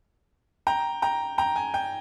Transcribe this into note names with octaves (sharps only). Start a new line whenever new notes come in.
G5 A#5
G5 A#5
G5 A#5
G#5
G5